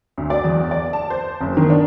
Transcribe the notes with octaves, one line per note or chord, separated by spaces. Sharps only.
D2
D5
E2
D5
A5
C5
F#1
D#3
D4